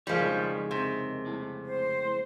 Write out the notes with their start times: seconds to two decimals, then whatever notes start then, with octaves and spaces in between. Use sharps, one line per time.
0.07 F2 C#3 F3 G3 G#3 D#4 A#4 C#5
0.71 C3
1.26 A3 E4 A5
1.65 C5